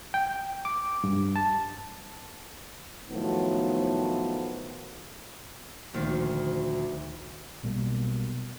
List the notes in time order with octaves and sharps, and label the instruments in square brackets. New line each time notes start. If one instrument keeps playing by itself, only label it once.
[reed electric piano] G5
D6
G2
A5
[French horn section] A2 D#3 F3 F#3 A3 B3
[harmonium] D2 [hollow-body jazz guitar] A#2 D#3 F3
[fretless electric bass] B1 B2 G3 A#3